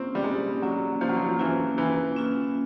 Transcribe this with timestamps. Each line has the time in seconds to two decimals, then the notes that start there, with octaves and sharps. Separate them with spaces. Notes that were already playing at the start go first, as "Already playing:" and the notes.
Already playing: A#3 C4 C#4 F4
0.15 G3
0.24 G#3 A#3
0.62 F#3 C#4 F4
1.01 F3 A#3
1.09 F#3
1.17 F3
1.29 F3
1.39 E3 C#4 F4
1.78 E3 A#3
2.16 C#4 F4